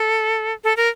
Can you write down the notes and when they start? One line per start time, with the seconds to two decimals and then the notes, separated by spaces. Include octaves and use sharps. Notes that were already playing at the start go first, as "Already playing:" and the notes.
Already playing: A4
0.64 A4
0.77 A#4